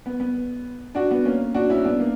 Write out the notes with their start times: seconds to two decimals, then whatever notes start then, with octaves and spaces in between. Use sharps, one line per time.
0.06 B3
0.20 B3
0.95 D4 F#4
1.11 B3
1.25 A#3 C#4
1.54 D4 F#4
1.69 C#4 E4
1.85 B3 D4
1.99 A#3